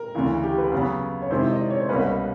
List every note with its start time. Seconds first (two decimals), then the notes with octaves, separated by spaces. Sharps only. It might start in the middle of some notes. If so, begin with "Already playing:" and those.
Already playing: A#4
0.15 D2 C#3 E3
0.43 G4
0.58 B4
0.72 C#3 F#3 B3
1.22 C#5
1.31 C3 D#3 G#3 C4 E4 C5
1.52 D#5
1.61 D5
1.70 C#5
1.80 C5
1.89 C2 B2 G3 A#3 C#4 B4